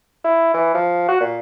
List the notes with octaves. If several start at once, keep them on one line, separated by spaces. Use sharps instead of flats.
E4
E3
F3
F#4
A#2